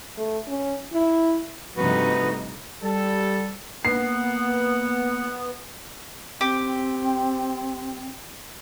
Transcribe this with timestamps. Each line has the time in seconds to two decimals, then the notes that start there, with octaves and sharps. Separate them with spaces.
0.18 A3
0.47 C#4
0.93 E4
1.77 G2 C3 F3 A3 D#4 F#4 B4
2.82 G3 A4
3.85 A#3 B3 F#5 C7
6.41 C4 G4